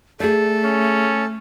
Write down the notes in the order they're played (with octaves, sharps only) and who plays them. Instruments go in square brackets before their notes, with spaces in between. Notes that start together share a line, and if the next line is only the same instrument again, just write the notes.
[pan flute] A3 [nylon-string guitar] G#4 D5 [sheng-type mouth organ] A4
[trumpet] C#4